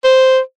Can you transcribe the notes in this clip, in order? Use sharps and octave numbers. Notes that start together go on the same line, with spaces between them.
C5